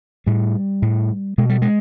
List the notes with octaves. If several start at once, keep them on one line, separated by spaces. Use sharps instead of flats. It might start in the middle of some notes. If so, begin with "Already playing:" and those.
A2 G3
A2
B2 G#3
G3
G#3